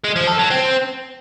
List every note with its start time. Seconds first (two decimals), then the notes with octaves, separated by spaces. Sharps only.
0.04 G#3
0.16 F3
0.27 A4
0.39 F#3
0.51 C4